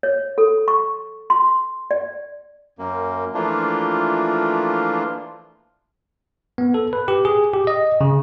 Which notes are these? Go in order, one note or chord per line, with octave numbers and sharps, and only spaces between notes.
C#5
A4
C#6
C6
D5
F#2 A#3
E3 F3 A3 A#3 D4 F4
B3
A4
B4
G4
G#4
G4
D#5
C#3